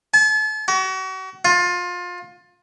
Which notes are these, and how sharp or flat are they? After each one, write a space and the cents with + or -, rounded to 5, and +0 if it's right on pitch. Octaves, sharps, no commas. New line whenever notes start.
A5 -40
F#4 +35
F4 +25